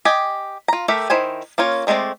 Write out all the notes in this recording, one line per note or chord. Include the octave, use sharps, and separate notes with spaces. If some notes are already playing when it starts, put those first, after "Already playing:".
G4 D#5 G#5
F4 A#5
A3 G4 A4 A#4 E5
D#3 E4 C5 G#5
A#3 C#4 F4 C#5
D#3 G#3 A3 C4 D5